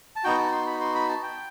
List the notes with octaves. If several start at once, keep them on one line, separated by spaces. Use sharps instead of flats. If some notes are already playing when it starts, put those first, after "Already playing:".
A5
B3 D#4 F#4 G5
A5
C6
B5
C6
B5
A5
G5